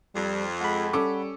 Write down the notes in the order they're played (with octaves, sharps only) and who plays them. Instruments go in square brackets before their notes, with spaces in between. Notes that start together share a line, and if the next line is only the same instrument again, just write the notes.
[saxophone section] F2 [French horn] G3
[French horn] G#3 [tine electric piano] F#5 B5
[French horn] G3 [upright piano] C#4 A4 D6